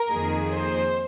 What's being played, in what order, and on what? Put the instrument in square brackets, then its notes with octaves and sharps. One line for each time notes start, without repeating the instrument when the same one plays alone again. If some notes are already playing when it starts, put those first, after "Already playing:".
Already playing: [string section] A#4
[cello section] F2 D#3 A#3 D#4 G#4
[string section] C5